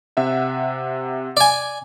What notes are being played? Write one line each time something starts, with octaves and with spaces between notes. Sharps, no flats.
C3 E5 F#5
D5 G#5